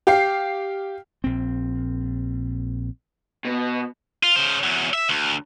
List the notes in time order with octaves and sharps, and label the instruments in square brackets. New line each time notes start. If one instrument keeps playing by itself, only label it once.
[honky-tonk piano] G4 F5 C7
[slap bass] A#1 C4
[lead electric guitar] B2
[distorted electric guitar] F4
C#3 C5
E2 F#3
E5
D2